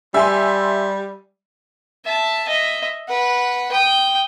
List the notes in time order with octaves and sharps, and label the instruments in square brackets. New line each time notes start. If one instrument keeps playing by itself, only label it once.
[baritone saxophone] G3 [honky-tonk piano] E5 G#5 C6
[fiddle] E5 A5
D#5 E5
B4 F#5
G5 D#6